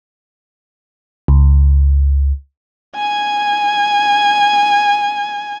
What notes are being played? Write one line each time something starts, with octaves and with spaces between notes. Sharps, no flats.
C#2
G#5 G#6